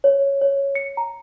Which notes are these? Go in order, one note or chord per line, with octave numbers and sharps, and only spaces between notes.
C#5
C#5
C#7
A#5